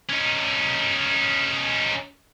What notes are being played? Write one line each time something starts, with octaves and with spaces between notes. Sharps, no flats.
C#4 D#4